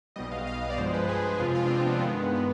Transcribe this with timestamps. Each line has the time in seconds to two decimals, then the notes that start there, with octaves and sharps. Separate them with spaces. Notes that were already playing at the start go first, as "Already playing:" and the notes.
0.16 B1 B2 G3 D#5
0.32 F5
0.47 F5
0.69 D5
0.78 G2 F3 G#3 C5
0.94 B4
1.09 G#4
1.39 F2 C3 F3 G#3 F4
1.55 F4
1.64 D4
1.70 C4
1.86 B3
2.02 G2 D#3 G#3 B3
2.23 B3
2.35 B3